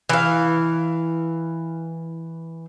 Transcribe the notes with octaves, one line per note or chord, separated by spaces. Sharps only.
E3 F5